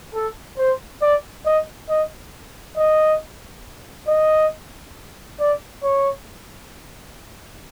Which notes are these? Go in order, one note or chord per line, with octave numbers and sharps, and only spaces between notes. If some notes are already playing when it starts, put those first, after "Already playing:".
A4
C5
D5
D#5
D#5
D#5
D#5
D5
C#5